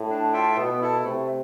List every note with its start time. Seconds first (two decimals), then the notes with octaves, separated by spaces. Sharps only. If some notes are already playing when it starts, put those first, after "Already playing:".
Already playing: A2
0.10 D4
0.33 F4 A4 E5 G5
0.57 B2 B3
0.81 E4 A4
1.04 C3 A3